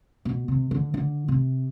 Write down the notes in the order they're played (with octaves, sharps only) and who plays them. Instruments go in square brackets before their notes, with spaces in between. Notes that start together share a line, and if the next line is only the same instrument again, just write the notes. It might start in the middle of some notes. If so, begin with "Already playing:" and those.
[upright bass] B2
C3
D3
D3
C3